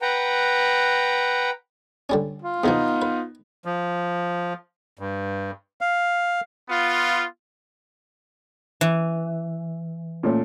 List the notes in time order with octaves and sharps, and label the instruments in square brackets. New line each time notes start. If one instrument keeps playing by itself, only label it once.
[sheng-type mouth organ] B4 F#5 G5 A#5
[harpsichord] D3 G3 C#4
[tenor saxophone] F4
[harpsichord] E2 C3 F3 [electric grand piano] B3 D#4
[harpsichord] B4
[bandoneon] F3
G2
F5
[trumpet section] B3 F4
[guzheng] E3
[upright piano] A#2 A3 C#4